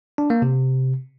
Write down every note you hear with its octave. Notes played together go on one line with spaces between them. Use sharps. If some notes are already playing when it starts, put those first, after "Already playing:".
D4
A#3
C3